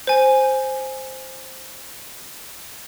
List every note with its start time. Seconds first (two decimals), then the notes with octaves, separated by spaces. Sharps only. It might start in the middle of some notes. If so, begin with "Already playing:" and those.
0.07 C5 G#5